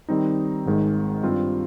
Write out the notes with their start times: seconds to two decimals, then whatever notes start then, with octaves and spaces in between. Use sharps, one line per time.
0.09 D#3 G3 C4 D#4
0.66 G#1 G#2 D#3 G#3
1.23 G2 G3 C4 F4